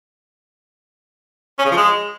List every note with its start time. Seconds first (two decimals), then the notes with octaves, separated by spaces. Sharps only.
1.59 C#4
1.65 C#3
1.71 F3
1.77 G#3